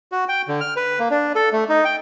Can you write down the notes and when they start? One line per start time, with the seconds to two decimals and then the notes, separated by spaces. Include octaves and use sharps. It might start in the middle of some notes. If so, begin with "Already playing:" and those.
0.12 F#4
0.29 G5
0.48 D3
0.61 F6
0.77 B4
0.99 A#3
1.11 D4
1.35 A4
1.53 A3
1.69 D#4
1.85 G5